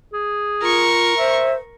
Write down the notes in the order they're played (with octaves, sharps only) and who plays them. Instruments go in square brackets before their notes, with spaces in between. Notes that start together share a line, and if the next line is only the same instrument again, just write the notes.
[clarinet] G#4
[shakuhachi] F4 [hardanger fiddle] A#4 C#6
[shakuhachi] C5 [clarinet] E5